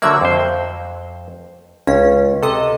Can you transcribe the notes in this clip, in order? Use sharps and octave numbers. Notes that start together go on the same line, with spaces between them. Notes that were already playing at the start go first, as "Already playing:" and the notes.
D3 F#3 A#3 D5 E5 E6
F2 C5
C#2 C#4
C3 A4 D#5